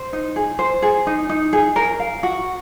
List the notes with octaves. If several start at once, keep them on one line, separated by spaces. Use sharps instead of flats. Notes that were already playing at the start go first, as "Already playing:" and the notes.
Already playing: C5
D#4
G#4
C5
G#4
D#4
D#4
G#4
A#4
F5
F#4